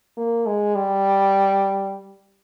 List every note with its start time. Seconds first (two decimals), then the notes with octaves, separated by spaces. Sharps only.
0.18 A#3
0.46 G#3
0.76 G3